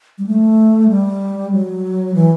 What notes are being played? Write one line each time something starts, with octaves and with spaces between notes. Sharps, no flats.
G3
A3
G3
F#3
E3